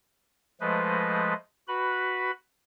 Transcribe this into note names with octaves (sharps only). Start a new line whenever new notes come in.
F3 G#3 A3 B4 C5 D#5
F#4 B4 B5